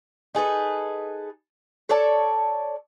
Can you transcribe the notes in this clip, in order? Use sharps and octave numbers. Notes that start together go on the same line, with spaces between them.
D#4 G#4 A4 B4
A4 C#5 D5 A5